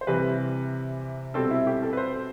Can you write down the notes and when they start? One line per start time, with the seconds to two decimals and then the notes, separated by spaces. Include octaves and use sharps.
0.01 C5
0.07 C3 E3 G3 B4
1.34 B2 G3 C4 A4
1.51 E4
1.67 G4
1.83 A4
1.93 B4
1.97 C5